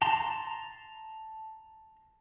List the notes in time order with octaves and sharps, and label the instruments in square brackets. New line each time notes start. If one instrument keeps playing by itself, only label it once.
[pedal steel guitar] A5 A#5 C6